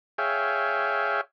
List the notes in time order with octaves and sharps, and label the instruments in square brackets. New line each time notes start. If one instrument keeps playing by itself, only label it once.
[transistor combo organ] G#4 C#5 E5 F5 G5